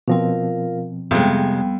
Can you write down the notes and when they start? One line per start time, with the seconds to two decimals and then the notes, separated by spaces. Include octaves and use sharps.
0.08 B2 F3 C4 F4 A#4 F5
1.11 F2 C3 G3 G#3 B3 G5